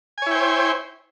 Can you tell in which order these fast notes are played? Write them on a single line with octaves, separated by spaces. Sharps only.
G#5 C#5 E4 G5 C5